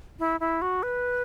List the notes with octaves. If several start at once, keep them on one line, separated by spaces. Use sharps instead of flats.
E4
E4
F#4
B4